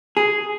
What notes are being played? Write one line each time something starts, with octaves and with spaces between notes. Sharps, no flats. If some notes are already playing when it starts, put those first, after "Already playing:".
G#4